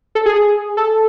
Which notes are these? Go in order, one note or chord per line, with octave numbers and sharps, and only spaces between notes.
A4
G#4
G#4
A4